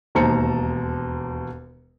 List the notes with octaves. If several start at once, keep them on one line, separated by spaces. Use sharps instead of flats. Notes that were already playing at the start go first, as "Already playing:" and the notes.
E1 D#2 C5 A5 A#5 C#7